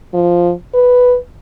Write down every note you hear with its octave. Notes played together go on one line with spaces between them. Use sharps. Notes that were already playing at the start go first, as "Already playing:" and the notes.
F3
B4